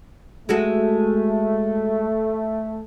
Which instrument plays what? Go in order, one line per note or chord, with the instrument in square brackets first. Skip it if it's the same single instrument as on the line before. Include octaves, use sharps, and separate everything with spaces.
[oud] G#3 F#4 A4 [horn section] A3